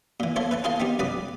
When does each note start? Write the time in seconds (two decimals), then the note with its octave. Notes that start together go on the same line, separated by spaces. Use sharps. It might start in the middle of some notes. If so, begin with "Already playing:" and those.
0.20 A#2 E3
0.36 A#3 A4 C5 C#5 E5
0.51 B4 E5 A5
0.64 E4 G#4 A#4 C5 F5 A5
0.80 B3 C4 D#4 G4
0.99 C2 F#2 B4 D5 B5 D#6